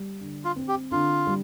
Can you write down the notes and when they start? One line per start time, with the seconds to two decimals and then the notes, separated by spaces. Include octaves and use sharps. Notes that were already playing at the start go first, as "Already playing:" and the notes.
Already playing: G3
0.21 D3
0.45 F4
0.56 C4
0.68 G4
0.91 D3 F4
1.27 G3